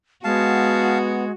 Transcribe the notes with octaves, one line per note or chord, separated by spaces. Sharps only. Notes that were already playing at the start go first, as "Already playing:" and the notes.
G#3 B3 F#4 F5 A5